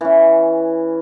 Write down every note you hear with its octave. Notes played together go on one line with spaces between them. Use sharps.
E3 C#4